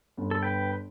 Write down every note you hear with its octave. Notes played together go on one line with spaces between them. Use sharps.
G1
A4
B4 G5